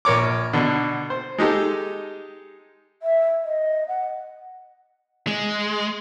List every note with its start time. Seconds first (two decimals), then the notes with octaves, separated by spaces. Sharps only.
0.05 A#1 A#4 C#5 D6
0.53 B2 D3
1.10 C5
1.38 G#3 D#4 G4 A4
3.02 E5
3.44 D#5
3.88 F#5
5.27 G#3